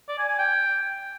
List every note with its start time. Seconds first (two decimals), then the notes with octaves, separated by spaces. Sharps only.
0.09 D5
0.19 G#5
0.29 G#5
0.39 G5